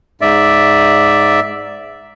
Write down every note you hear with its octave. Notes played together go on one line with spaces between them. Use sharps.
G#2 D5 E5